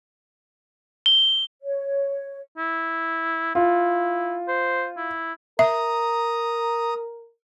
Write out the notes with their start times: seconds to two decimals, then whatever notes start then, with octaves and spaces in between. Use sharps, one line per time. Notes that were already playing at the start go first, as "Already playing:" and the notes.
1.06 G7
1.62 C#5
2.58 E4
3.55 E4 F4
4.48 C5
4.97 E4
5.59 A#4 E5 A#5 D#6